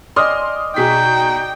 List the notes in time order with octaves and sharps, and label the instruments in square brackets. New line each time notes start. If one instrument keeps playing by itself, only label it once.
[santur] D5 D#5 G#5 [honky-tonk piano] C6 D#6 F6
[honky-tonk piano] B2 G#4 B6 [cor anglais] D#4 [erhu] G5